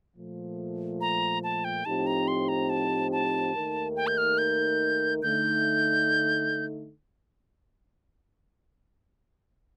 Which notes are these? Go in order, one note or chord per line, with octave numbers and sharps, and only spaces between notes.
A#2 F3 A3
A#5
A5
G5
A2 F3 C4 D#4 G4 A5
A#5
C6
A#5
A5
A5
D#2 D#3 A3 D#4 A#4
G5
G6
F6
G6
D3 A3 D#4 G6